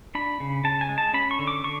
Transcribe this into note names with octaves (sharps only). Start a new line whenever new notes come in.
D4 B5
C#3
C#3 A5
G#5
G#3
A5
C#4 B5
C#6
D3
D6
D3 C#6